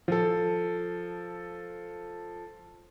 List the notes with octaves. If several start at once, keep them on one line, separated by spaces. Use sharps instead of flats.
F3 A4